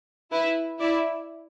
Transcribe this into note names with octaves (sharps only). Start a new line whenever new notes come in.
E4 B4
E4 D5